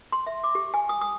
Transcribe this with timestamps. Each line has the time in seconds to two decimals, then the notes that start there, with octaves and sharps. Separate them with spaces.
0.12 C6
0.27 E5
0.44 D6
0.55 G4
0.74 G#5
0.89 D#6
1.01 D#6